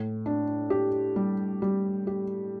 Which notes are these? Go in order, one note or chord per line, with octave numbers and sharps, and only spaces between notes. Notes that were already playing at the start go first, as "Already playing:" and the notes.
Already playing: A2
D4
G4
G3
G3
G4